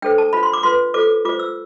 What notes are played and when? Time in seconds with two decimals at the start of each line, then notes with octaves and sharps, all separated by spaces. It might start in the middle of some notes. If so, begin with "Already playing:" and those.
0.02 D4 A4 C5 G5
0.18 A5
0.33 F4 C5 B5
0.43 C6
0.53 D6
0.63 F4 B4 C6
0.94 F4 A4 C5 D6
1.25 F4 C5 D6
1.39 E6